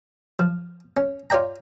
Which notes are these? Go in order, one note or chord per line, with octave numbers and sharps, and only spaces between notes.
F3
C#4
F4 C#5 D5 G5 A#5